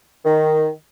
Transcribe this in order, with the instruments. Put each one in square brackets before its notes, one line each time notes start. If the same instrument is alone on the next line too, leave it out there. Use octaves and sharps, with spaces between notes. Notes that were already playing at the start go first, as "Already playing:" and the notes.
[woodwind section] D#3